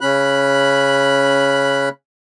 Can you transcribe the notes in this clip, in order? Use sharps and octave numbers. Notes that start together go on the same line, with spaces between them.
C#3 C#4 B5 F#6